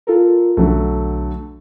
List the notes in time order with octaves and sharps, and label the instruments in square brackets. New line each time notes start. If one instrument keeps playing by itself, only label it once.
[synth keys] F4 A4 A#4
[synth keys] B1 [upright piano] D3 F#3 A3